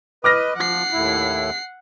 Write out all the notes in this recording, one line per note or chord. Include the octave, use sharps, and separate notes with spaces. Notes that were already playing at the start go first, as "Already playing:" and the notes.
B4 D#5 D6 F6 A#6
F3 F#5 C7
D#2 A2 E4